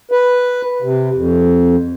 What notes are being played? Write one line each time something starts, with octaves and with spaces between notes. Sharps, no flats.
B4
C3
F2